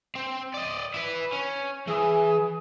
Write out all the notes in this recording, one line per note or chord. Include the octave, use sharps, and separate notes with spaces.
C4
D5 D#5
E4 B4
C#4
E3 G#4